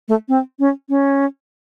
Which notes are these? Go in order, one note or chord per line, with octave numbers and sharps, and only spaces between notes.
A3
C4
C#4
C#4